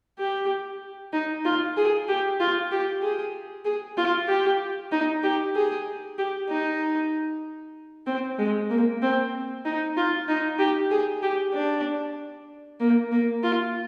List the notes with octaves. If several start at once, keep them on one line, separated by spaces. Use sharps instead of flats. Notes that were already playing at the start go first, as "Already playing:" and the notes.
G4
D#4
F4
G#4
G4
F4
G4
G#4
G#4
F4
G4
D#4
G4
G#4
G4
D#4
C4
G#3
A#3
C4
D#4
F4
D#4
G4
G#4
G4
D4
A#3
A#3
F4